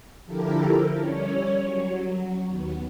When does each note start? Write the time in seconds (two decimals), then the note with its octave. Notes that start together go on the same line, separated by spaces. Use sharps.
0.24 D3 F3 E4 G4 A4 A#4
0.99 G3 C#4 C#5
1.62 F#3
2.49 D#2 B3